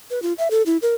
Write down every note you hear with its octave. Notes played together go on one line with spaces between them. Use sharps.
B4
F4
E5
A4
E4
A#4